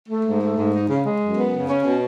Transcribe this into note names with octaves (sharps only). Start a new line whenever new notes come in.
A3
G#2
A3
G#2
D#4
C#3
G#3
F#2
B3
C#3
C#4
B2